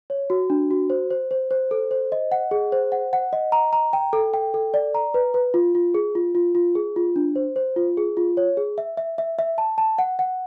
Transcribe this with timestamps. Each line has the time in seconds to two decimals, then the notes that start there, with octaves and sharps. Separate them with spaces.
0.10 C#5
0.30 F#4
0.50 D4
0.71 F#4
0.90 C5
1.11 C5
1.31 C5
1.51 C5
1.71 A4
1.91 C5
2.12 D#5
2.32 F#5
2.51 G#4
2.72 C5
2.92 F#5
3.13 F#5
3.33 D#5
3.52 A#5
3.73 A#5
3.93 G5
4.13 A4
4.34 G5
4.54 A4
4.74 D5
4.95 A#5
5.14 B4
5.34 B4
5.54 F4
5.75 F4
5.94 G#4
6.15 F4
6.35 F4
6.55 F4
6.75 G#4
6.96 F4
7.16 D4
7.36 C5
7.56 C5
7.76 F4
7.97 G#4
8.17 F4
8.37 C#5
8.57 G#4
8.78 E5
8.97 E5
9.18 E5
9.39 E5
9.58 A5
9.78 A5
9.98 F#5
10.19 F#5